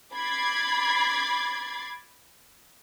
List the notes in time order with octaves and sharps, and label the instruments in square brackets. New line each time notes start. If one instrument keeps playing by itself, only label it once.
[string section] B5 D6 G#6 A6 C7